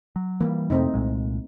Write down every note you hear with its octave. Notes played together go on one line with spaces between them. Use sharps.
F#3
E3 F#3 G3 A#3
F2 C3 A3 C4 D#4
C2 A#2 G#3